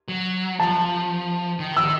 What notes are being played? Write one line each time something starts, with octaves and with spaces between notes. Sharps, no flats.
F#3
F3 A5
D#3
E6